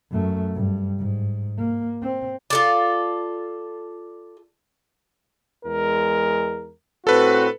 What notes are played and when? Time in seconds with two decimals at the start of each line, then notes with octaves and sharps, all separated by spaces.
0.11 F#2 A3
0.54 G2
0.98 G#2
1.57 A#3
2.02 C4
2.50 F4 A4 D5
5.65 E2 G#3 A#4
7.07 A2 C4 F#4 A4 B4